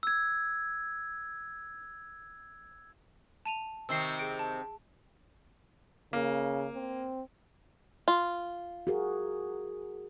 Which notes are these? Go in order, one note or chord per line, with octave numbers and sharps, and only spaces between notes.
E6 G#6
A5 D#7 F7
C3 D#3 C4 E6 C7
G#4 D7
A5
C#3 A#3
C4
F4
F#4 G#4 A#4